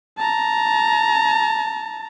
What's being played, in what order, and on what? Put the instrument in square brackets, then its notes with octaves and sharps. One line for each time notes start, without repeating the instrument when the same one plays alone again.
[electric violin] A5 A#5